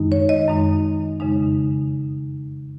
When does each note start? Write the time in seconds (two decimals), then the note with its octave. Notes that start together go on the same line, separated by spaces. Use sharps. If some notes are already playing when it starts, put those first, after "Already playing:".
Already playing: F#2 D#3 G#3 D#4
0.12 C#5
0.29 D#5
0.48 F#2 D#3 G#3 D#4
1.20 F2 C#3 G#3 D#4